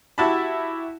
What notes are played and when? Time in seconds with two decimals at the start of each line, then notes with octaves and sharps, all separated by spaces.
0.18 E4 F#4 G4 A5 B5